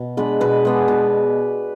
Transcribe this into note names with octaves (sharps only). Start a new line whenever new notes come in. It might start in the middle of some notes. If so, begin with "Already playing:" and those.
Already playing: B2
G#3 B3 D4 B4
B2 B4
G#3 B3 D4
B2